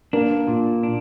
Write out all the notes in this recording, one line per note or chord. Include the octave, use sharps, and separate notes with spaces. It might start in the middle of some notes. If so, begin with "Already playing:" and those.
A#3 D4
A#2
D4